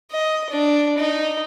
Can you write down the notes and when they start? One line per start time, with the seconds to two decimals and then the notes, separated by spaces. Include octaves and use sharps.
0.11 D#5
0.50 D4
0.97 D#4